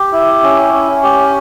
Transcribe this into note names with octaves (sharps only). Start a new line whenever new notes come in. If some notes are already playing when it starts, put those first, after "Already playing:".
Already playing: G4
E4
C#4
C#4
G4